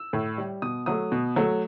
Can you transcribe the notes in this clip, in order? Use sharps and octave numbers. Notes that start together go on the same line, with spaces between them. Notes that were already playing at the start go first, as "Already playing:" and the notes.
Already playing: E6
A2
G3
B2 D#6
F#3 A3 D#6
B2
F#3 A3